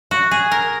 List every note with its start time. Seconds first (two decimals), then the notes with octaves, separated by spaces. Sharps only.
0.11 F#4
0.31 G#4
0.51 A#4